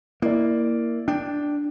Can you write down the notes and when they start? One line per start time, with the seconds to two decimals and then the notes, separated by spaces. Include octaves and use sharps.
0.22 A#3 E4 D5
1.08 D4 G5